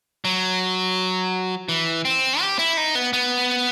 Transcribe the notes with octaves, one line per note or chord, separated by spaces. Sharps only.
F#3
E3
C4
G4
E4
D#4
B3
B3